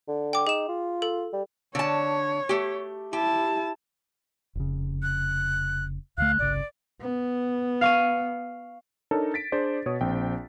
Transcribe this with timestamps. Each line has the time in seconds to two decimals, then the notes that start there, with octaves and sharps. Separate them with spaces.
0.08 D3
0.33 G5 D6
0.47 D#4 G#4 E7
0.68 F4
1.02 A4
1.33 G3
1.75 D3 C#5 A5
2.49 A3 G4
3.13 E4 G4 A5
4.55 F1 C#3
5.03 F#6
6.17 D2 D3 A3 F5 F#6
6.39 G1 C2 C#3 D5
7.01 B3
7.81 F5 C#6 D#7
9.11 D4 D#4 A4 A#4 C#5
9.34 A6 B6 D7
9.52 D4 G#4 C5 D5
9.86 B2 C#5 D#6
10.01 A#1 C4 G5